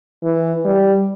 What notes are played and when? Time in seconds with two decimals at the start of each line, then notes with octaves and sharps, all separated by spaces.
0.23 E3
0.65 G3